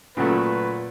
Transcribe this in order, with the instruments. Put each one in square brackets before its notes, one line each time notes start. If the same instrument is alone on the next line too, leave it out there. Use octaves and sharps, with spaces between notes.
[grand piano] A#2 [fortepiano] C#3 F#3 A3 [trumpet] B4